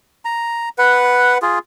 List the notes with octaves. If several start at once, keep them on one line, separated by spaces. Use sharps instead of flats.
A#5
B4 F#5
F4 G#4